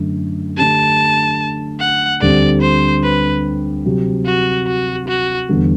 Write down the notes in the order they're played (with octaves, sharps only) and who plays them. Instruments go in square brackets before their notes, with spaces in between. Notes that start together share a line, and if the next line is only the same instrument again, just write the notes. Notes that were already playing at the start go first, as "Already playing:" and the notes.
Already playing: [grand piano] F#2 D3 A3
[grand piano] D3 A3 D4 G4 [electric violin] A5
[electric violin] F#5
[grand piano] D2 D3 G3 C4 G4 [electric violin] D5
[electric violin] C5
B4
[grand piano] C3 F#3 C4 G4
[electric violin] F#4
F#4
F#4
[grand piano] E2 D3 G3 B3